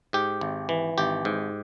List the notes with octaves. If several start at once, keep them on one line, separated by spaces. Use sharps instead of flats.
G#2 G4
G#1
E3
G#1 G4
G#2